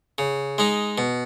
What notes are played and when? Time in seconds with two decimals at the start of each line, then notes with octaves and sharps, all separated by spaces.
0.18 C#3
0.58 G#3 D#4
0.98 B2